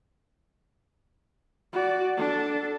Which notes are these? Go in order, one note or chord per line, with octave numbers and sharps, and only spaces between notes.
F#4 D5
D4 A4